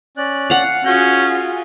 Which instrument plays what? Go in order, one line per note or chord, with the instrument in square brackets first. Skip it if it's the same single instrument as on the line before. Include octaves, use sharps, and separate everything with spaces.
[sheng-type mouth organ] C#4 D5 F#6
[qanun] F5 F#5
[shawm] C#4 [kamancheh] F4 G#4 [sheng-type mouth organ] F#4 G6
[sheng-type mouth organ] F#4